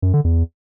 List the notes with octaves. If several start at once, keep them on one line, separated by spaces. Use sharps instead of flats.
F#2
D3
E2